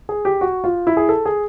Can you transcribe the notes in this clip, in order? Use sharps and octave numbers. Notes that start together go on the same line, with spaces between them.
G#4
G4
F#4
F4
E4
G#4
A4
G#4